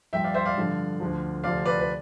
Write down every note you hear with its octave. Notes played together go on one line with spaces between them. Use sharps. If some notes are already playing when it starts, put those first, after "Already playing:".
G2 F3 E5 G5
D5 F5
C5 E5
D5 F5
G2 D3 F3
D2 D3 F3
D2 C3 F3 D5 F5
B4 D5
B4